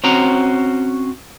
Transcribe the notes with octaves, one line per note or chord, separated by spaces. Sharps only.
C4 C#4 F#4 C5 A#5